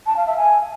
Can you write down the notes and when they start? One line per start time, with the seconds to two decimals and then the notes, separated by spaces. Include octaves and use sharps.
0.07 A5
0.17 F5
0.27 E5
0.37 G#5